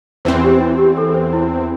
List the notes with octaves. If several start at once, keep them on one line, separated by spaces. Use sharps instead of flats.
E2 E3 C4 C5
G4
E4
G4
A4
C5
E4